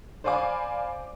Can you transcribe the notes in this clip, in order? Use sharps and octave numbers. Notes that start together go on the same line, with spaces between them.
C5 D5 F5 G#5 B5 D6